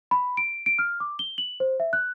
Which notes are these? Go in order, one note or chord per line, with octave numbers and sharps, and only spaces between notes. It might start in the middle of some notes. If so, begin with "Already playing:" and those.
B5
D7
D7
F6
D6
G7
F#7
C5
E5
F#6